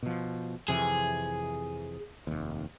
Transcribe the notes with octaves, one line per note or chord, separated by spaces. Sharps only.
B2 F3
F2 C3 E3 G#4
F1 D#2